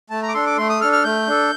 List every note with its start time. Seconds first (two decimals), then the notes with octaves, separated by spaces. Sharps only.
0.10 A3 A5
0.22 A#5
0.28 D6
0.34 D4 A4 C6
0.46 D6
0.57 A3 C6
0.69 D#6
0.80 D4 A4 F6
0.92 F6
1.04 A3 G6
1.27 D4 A4